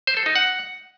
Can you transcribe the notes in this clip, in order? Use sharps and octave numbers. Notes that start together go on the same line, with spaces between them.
C5
A4
D#4
F#5